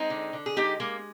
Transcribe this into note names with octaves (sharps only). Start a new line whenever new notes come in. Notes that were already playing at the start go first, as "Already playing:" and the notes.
Already playing: G#3 C4 D#4
D3
D3
G#4
G#3 D#4 G4
G#3 A#3